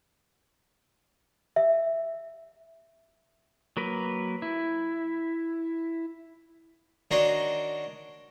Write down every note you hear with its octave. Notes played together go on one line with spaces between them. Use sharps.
E5
F#3 A#3 A#4 B4
E4
D#3 D4 F#4 C#5 A#5 C6